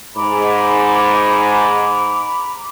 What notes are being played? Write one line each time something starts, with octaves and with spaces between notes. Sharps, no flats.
G#2 A#5 B5 D6